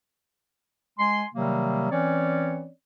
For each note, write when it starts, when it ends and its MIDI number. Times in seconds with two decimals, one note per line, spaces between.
0.99 1.25 56
0.99 1.25 80
0.99 1.25 84
1.35 1.89 48
1.35 1.89 51
1.35 1.89 54
1.35 1.89 55
1.35 1.89 58
1.92 2.69 52
1.92 2.69 60
1.92 2.69 61
1.92 2.69 73
1.92 2.69 74